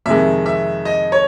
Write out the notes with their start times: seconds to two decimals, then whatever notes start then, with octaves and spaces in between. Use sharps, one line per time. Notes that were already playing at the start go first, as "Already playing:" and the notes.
0.06 F2 C3 D#3 G#3 E5
0.46 E5
0.85 D#5
1.12 C#5